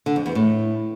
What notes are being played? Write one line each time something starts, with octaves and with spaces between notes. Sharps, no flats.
D3
F2
E2
A2